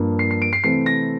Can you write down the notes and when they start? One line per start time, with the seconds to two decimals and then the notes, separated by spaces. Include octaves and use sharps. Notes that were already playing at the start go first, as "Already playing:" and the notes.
Already playing: G2 F3 A#3 D4
0.19 C7
0.31 C7
0.42 D7
0.53 C7
0.64 C3 E3 A3 C4 C7
0.86 A#6